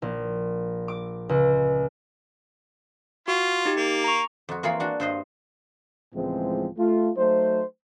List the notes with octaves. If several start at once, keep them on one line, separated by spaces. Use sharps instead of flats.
A#1
D6
C#2
F4 F#4
D#4 G4
A#3
A#5 C#6
F2 F#4
E3 A#3 F4 G#4 C#5 B5
D4 F#4
G2 C5 D#5
C#2 A2 E3 F3 G#3 C4
A3 F4
F#3 A3 D#4 C5